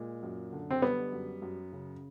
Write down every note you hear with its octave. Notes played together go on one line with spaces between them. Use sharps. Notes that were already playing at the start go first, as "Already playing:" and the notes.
Already playing: A#2 G#3
F#2
D3
C4
G3 B3
F#2
F#2
C#3